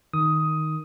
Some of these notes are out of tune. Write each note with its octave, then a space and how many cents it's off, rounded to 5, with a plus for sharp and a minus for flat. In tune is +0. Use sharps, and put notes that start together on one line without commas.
D#3 +0 D#4 +0 D#6 +10